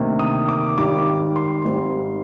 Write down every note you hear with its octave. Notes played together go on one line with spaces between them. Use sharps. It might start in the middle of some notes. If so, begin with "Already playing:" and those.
Already playing: D2 C3 D#3 A#3
D#6
D6
G#1 G#2 D#3 G3 D6
C6
G#1 G#2 G3 C4